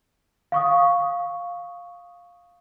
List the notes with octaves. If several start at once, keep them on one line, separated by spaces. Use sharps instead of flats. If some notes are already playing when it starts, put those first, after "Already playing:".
F5 C#6 D#6